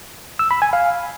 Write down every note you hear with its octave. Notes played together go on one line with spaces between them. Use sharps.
E6
B5
G#5
F5